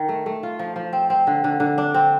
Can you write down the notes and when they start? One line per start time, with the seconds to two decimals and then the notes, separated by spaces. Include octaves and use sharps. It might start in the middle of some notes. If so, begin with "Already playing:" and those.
Already playing: D#3
0.09 A3
0.26 A3
0.43 F4
0.59 F3
0.76 F3
0.93 C4
1.10 C4
1.27 D3
1.44 D3
1.60 D3
1.78 D4
1.94 C4